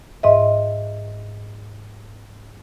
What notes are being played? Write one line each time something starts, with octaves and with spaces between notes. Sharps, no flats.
G#2 D#5 E5